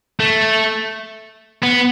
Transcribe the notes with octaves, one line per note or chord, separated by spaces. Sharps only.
A3
B3